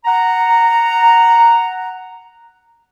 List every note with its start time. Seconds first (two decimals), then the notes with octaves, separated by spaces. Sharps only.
0.05 F#5 A#5